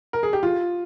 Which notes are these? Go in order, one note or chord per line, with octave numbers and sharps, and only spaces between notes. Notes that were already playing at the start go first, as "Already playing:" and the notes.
A#4
G#4
G4
F4